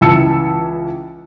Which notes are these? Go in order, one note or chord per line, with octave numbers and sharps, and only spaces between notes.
C#2 E3 A5 E6 C#7